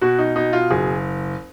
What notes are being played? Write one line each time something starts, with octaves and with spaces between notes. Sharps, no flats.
B2 F#4
D#4
B2 D#4
F4
F#1 G#4